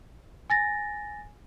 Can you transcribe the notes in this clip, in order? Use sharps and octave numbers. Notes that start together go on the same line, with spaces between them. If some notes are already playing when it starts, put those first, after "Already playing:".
G#5 A6 A#6